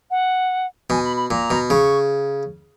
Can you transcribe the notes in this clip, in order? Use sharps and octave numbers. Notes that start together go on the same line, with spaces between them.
F#5
B2 G#5
B5
B5
A#2 A#5
B2
C#3 C#6